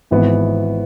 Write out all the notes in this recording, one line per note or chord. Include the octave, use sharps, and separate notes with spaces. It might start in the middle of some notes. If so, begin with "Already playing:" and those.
G#1 G#2 E3 B3